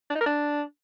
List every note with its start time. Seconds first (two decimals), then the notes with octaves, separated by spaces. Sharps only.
0.10 D4
0.15 D#4
0.21 A#4
0.26 D4